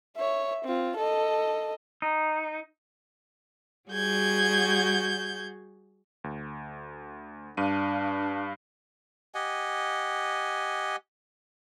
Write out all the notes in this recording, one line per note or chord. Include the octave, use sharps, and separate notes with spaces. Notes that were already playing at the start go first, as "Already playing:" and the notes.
C#5 E5
C4 F4
A4 D#5
D#4
G3 F#4 G#4 G6 G#6
D2
G2 D4 F5 D#7
G4 D#5 F#5 G#5